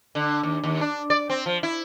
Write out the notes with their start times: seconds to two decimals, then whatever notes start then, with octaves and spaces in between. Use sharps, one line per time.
0.15 D3
0.43 D#2
0.64 D#2
0.81 D4
1.10 D5
1.30 C4
1.46 F3
1.63 E4